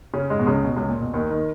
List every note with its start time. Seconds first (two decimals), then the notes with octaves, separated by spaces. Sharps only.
0.14 C#3 C#4
0.30 G#2 G#3
0.39 B2
0.47 C#2 C#3
0.64 B2
0.76 C#2 C#3
0.89 A#2
1.01 B2
1.14 D#2 D#3
1.30 D#3